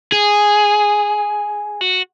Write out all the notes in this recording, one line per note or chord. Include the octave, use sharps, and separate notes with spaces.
G#4
F#4